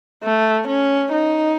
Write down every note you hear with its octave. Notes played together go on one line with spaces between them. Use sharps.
A3
C#4
D#4